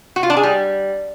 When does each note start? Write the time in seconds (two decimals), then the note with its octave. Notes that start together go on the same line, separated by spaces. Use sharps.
0.16 F#4
0.23 F4
0.30 D4
0.37 G#4
0.43 G3